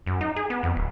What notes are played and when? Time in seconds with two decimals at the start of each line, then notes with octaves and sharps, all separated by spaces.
0.06 F#2
0.21 D#4
0.36 G#4
0.50 B3
0.63 F2
0.76 D1